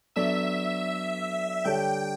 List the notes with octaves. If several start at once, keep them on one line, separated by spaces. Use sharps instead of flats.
F#3 B3 D4 A4 D5 E5
D3 G3 D4 A4 C#5 G5